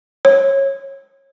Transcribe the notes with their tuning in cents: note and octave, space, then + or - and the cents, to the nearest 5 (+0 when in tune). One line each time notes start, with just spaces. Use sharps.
C#5 -25